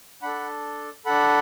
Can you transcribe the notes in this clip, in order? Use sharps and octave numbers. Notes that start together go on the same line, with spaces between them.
D4 A4 F#5 B5
D4 A4 F#5 B5